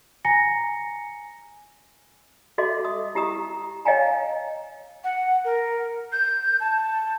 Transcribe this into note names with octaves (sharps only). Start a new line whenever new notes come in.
G#5 A#5 A#6 C#7
F#4 A4 D#5 E5 C6 D6
D#6
E4 G4 A#5 D#6
C#5 D#5 F5 G5 G#5 A#5
F#5
A#4
G6
A5